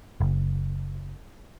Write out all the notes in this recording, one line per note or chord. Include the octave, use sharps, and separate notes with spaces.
F#1